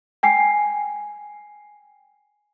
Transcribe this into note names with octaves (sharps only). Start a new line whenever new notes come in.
G5 G#5 C7